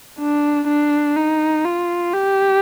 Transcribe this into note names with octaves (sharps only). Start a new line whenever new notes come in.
D4
D4
D#4
F4
G4